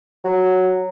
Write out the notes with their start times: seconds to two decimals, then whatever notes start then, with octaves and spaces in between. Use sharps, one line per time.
0.25 F#3